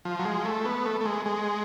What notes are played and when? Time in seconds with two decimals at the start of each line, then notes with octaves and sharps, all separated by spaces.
0.05 F3
0.19 F#3
0.25 G#3
0.45 A3
0.65 B3
0.85 A3
1.01 A3
1.05 G#3
1.26 G#3